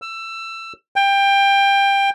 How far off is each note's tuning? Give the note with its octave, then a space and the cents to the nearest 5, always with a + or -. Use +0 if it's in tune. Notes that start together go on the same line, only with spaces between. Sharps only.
E6 +20
G5 +20